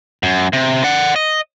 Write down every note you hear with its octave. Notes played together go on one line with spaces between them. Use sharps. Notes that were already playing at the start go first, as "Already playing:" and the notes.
F#2
C3
D5 F#5
D#5